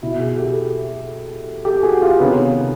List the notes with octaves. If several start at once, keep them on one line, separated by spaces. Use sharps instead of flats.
B2 E4 F#4
F#4 G#4
G4 A4
G4 A4
F#4 G#4
F4 G4
C3 D#3 B3 C#4